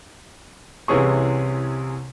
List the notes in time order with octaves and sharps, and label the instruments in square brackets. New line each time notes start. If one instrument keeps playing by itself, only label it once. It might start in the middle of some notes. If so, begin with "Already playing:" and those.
[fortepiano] C2 C3 E3 C#4 G#4 C#6